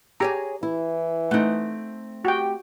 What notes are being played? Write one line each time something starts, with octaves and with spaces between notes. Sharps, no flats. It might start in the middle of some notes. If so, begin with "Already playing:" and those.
G4 G#4 C#5 G#5 A#5
E3 E4
A3 C4 D#4 F#5
F#4 G4 G5